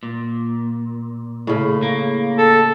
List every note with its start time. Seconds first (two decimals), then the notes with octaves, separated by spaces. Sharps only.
0.03 A#2
1.47 A2 C#3
1.83 A#3
2.38 A4